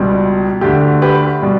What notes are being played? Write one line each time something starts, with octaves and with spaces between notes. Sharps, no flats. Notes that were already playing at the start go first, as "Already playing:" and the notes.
Already playing: C#2 B2 G3
D2 D3 A3 G4
G4 B4
B2 G3